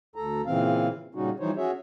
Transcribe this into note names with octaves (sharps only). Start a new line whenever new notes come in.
D2 A4 A#5
A#2 C#3 E3 C4 F5
A#2 C#3 G3 C#4 D#4 F#4
E3 F3 G3 D#4 C5 C#5
C#4 F#4 G#4 C#5 E5